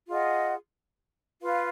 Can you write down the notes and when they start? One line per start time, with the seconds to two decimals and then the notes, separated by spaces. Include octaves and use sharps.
0.08 F4 G#4 D#5 F#5
1.41 F4 B4 F5